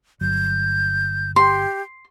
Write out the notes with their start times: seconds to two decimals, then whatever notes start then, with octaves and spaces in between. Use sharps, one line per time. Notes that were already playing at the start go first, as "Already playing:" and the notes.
0.21 G1 F#3 G6
1.36 G4 C6